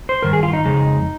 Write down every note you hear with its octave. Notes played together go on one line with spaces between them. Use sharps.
C5
G2 D#3 A#4
G#4
F4
D#4
F2 C#3 G#3